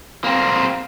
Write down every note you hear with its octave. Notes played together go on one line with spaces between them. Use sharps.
A#3 C4